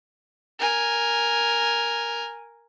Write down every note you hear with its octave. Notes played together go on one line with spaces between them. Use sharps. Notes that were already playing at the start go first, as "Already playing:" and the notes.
A#4 G#5